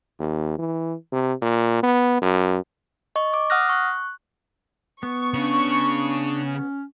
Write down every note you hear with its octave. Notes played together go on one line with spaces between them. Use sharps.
D#2
E3
C3
A#2
B3
F#2
D#5 C#6
D6
F#5 D#6 F6 F#6 A#6
C#6 F#6
B3 C#6
C#3 D4
C#4